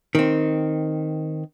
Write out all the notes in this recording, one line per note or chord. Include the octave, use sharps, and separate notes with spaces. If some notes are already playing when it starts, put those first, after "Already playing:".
D#3 C4